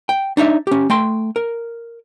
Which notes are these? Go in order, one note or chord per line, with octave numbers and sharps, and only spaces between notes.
G5
D4 D#4 C#5 E5
C#4 G4
A3 G5 C6
A#4